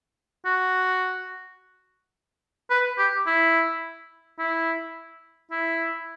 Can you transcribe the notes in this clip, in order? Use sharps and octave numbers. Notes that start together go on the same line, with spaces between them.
F#4
B4
G4
E4
E4
E4